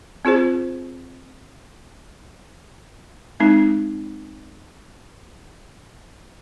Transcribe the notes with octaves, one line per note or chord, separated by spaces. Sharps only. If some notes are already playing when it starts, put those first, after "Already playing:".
C4 F4 G#4 C5
G#3 C4 D#4